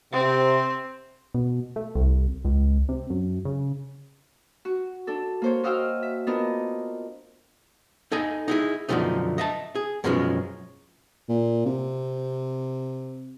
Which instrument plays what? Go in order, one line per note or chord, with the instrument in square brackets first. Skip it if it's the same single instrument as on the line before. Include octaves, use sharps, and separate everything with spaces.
[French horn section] C3 [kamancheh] C4
[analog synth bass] B2
A3
C2
C#2
C3
F#2
C#3
[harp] F#4
D4 A4
A#3 C5 C#5
F#4 D#5 F5 G5 E6 F6
E5
B3 C4 D4 F4 A#4 D#5
[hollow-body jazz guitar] D#4 A4 D#5 G#5
D#4 E4 G#4
F#2 B2 D3 F3 A3 D#4
D#5 E5 A5
G#4
F#2 B2 F3 G#3 C4 C#4
[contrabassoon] A#2
C3